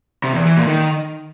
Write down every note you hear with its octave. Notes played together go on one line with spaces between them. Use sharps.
C3
E2
E3
A#2
D#3